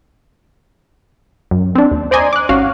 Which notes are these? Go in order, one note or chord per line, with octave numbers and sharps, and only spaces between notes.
F#2
C4 D4
D#2
C5 D5 D#5 G#5 A#5 C6
D6 F#6
G#1 C#4 F#4 F5 F6